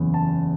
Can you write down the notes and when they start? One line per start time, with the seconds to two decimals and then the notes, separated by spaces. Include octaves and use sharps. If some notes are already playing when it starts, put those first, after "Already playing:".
Already playing: F#1 E2 C#3
0.14 A5